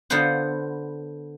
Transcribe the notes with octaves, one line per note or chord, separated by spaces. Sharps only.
D3 B3 F4 B4 C5 F#5